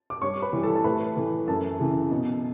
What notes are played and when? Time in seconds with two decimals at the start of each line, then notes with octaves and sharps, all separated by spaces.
0.10 D6
0.22 G2 C#5 C#6
0.42 B4 B5
0.53 E3 G3
0.63 A4 A5
0.76 A5
0.84 A2 B4 B5
1.17 E3 A3
1.48 F#2 A4 A5
1.79 C#3 E3
2.11 B2